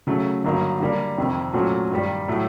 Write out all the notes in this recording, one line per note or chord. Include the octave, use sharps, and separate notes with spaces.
C#3 F#3 A3
G2 D3 F#3 A#3 D#4
D3 G3 A#3 D4
F2 C3 D#3
A#2 F#3 A3 C#4 F#4
G2 D#3 G3
A2 F#3 A3